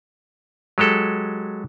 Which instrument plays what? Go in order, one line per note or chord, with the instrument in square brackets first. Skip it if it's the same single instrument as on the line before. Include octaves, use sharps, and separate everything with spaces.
[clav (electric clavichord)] F#3 G#3 G4 A4